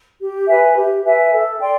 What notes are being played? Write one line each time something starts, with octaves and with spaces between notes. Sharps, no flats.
G4
B4 E5 G#5
G4
B4 E5 G#5
A4
D5 G5 C6